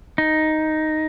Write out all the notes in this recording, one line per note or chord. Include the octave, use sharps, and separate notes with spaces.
D#4